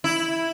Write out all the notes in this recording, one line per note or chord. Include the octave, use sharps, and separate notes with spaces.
E4